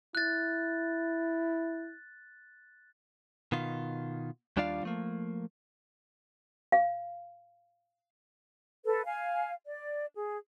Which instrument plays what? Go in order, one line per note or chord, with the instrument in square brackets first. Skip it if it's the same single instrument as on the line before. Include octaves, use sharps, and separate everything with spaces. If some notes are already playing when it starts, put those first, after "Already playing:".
[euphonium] E4 [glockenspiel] F#6 A6
[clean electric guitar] B2 D#3 F4
D#2 G3 D4 F4 D5 F5
F3 A3 A#3
[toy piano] F5
[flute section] A4 B4
F5 G#5
D5
G#4